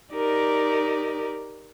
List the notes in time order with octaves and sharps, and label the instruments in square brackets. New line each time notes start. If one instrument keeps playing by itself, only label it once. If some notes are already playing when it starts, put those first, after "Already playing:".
[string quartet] D#4 G4 A#4 D5